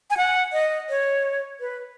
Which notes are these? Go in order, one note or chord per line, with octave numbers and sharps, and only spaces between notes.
G#5
F#5
D#5
C#5
B4